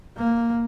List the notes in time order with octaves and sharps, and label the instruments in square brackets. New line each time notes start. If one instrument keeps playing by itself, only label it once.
[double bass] A#3